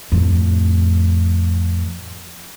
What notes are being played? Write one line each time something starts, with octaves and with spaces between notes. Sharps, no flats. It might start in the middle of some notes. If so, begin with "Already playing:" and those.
F2 A2